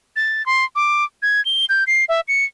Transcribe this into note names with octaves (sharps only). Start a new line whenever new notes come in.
A6
C6
D6
G#6
G7
G6
C7
E5
C#7